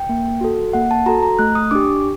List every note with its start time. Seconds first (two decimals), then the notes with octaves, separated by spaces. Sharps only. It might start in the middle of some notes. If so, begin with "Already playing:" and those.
Already playing: G5
0.09 A#3
0.41 F#4 A4
0.73 A#3 F#5
0.91 A5
1.06 F#4 A4 A#5
1.23 A#5
1.39 A3 F#6
1.55 D#6
1.71 D4 G4 D6